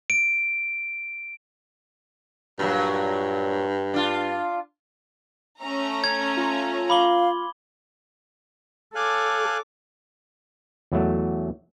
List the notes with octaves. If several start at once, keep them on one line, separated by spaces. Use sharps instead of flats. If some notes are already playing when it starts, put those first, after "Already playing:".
D7
G2 A#2 F#3
D4 F4
A3 C#4 A#5
G#6
F4
F5 B5 D6 G7
A4 C#5 F5 G#5 D6 F#6
E2 F#3 A3